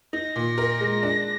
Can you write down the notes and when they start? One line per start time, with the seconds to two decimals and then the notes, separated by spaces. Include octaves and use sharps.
0.13 D#4 A#6
0.36 A#2
0.58 A#4
0.81 G#3
1.03 D4